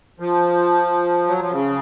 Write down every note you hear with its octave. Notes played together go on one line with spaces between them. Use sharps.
F3
F#3
F3
C#3